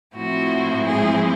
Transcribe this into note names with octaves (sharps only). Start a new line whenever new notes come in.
A2 F3 A3 C4 E4 F#4
G#3 G#4